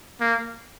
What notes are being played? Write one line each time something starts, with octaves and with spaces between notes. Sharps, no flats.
A#3